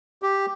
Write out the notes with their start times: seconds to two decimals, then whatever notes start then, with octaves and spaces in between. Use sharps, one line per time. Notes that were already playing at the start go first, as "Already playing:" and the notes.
0.22 G4